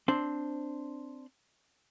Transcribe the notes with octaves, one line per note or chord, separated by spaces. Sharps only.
C4 D4 C5